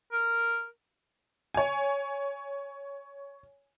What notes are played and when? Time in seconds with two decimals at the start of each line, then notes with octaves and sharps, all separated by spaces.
0.12 A#4
1.54 C#5 G#5